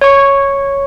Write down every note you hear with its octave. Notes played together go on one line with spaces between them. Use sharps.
C#5 C#6